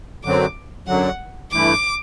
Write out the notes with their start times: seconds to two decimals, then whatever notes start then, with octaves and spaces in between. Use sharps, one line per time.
0.23 F#2 D3 F#3 C4 D6
0.87 F#2 D3 F#3 F#5
1.51 G2 E3 A3 E4 D6